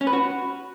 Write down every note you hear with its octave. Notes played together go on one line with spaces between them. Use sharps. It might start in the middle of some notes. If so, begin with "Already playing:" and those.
C#4
B4
F#4